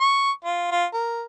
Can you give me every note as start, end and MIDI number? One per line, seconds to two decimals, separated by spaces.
0.01 0.31 85
0.45 0.68 65
0.72 0.85 65
0.94 1.23 70